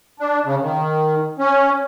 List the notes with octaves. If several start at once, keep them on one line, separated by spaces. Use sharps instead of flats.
D4
C#3
D#3
C#4